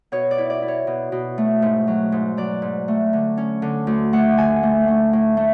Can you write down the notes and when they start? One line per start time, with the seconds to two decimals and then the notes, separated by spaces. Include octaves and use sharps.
0.12 B2 C#5
0.31 D5
0.38 E4
0.50 D5
0.62 E4
0.68 C#5
0.87 B2
1.12 B2
1.38 A3
1.62 G#2
1.87 F#3
2.12 G#2
2.37 F#3 D5
2.62 G#2
2.88 A3
3.13 D3
3.37 C#4
3.62 D3
3.87 D2
4.13 A3 F#5
4.37 D3 G#5
4.63 A3
4.88 A3
5.13 A2
5.37 A3